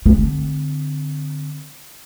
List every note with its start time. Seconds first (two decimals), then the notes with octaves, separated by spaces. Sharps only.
0.06 D3 C4